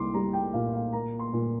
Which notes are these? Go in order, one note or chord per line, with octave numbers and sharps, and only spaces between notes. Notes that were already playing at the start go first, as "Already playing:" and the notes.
Already playing: C2 A#3 C6 D6
G3 A#5
G5
A#2 F5
F5
A#3 A#5
C6
A#2